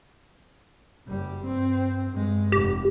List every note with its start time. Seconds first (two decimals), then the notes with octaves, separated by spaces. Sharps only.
1.08 F#1 G3
1.43 G2 C4
2.10 G2 G#3
2.52 F1 G4